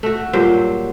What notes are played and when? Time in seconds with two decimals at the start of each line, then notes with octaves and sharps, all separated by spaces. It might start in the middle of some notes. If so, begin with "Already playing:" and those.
0.03 A3 F#4
0.33 G2 A#2 F#3 C5